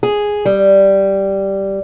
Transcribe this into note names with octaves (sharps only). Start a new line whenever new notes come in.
G#4
G3